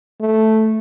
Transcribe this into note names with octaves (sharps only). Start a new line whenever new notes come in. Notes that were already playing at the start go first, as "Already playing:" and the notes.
A3